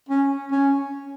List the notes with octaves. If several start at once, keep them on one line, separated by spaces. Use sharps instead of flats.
C#4
C#4